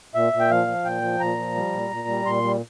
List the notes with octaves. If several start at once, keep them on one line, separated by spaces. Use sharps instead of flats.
A#2 E5
A#2
G5
F3 F5
F3
A#2 G5
F3
A#2 A#5
F3
G3
A#2
A#2
G3
A#2 C6
G3